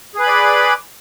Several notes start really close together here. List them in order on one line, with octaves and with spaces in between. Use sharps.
G#4 B4 B5 D5